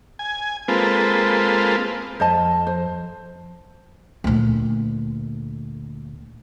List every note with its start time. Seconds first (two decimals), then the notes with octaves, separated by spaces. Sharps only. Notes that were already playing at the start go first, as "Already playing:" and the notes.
0.19 G#5
0.68 G#3 A#3 C4 F4 A4 B4
2.20 F2 C5 D#5 A5
2.67 C5
4.24 D2 A#2